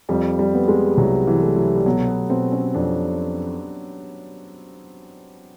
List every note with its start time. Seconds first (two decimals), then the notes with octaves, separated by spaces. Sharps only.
0.09 F2 G3
0.39 G3
0.54 B3
0.68 G#3
0.97 C2 F#3
1.27 E3
1.42 A3
1.56 F#3
1.76 G3
1.86 B2 F#3
2.08 B3
2.30 B2 C4
2.52 C#4
2.75 F2 D4